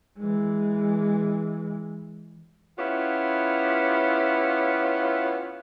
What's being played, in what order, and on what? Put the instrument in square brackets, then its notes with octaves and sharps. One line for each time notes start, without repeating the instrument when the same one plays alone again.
[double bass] E3 G#3
[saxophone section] B3 C#4 E4 F4 G4